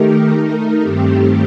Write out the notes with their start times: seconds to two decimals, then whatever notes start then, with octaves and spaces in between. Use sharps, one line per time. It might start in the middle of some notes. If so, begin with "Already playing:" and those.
Already playing: D#3 A3 D#4 G4 A#4
0.31 A3 D#4 A#4
0.81 G2 D#3 A3 C4 G4